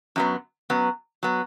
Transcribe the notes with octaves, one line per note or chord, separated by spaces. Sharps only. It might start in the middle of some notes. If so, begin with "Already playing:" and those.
F#2 F#3 B3
F#2 F#3 B3
F#3 B3